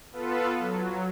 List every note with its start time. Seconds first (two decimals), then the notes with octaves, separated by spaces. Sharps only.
0.12 B3 F4 A4 B4
0.59 F#3